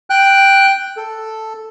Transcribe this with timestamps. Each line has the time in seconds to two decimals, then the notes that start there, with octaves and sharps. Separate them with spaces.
0.10 G5 F#6
0.97 A4